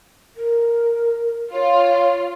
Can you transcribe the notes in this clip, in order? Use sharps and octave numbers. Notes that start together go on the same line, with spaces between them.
A#4
F4 C#5